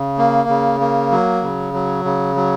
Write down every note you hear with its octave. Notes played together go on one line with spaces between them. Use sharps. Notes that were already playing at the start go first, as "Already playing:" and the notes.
Already playing: C#3
A#3
C#3
A#3
F#3
C#3
F#3
C#3
F#3